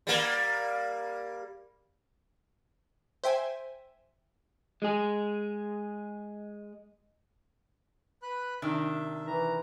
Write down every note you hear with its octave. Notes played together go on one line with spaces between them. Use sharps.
G3 A#3
C5 E5 G5 G#5
G#3 G#4
B4 B5 F#6
C3 D#3 D4 E5
E3 A#5